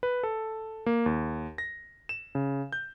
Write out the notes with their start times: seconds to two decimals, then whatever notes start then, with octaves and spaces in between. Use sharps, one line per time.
0.03 B4
0.23 A4
0.86 A#3
1.06 D#2
1.58 A#6
2.09 E7
2.35 C#3
2.73 G6